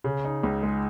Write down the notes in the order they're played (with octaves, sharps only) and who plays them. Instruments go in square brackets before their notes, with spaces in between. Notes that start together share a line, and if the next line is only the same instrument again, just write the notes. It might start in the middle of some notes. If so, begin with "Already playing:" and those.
[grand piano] C#3
D#4
C#2
G#3